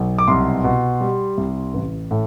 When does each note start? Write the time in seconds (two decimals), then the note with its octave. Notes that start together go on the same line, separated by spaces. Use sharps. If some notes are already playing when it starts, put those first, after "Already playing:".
Already playing: B1
0.19 D6
0.28 C2 C6
0.64 B2
1.01 G3
1.38 C2
1.74 A1
2.11 A2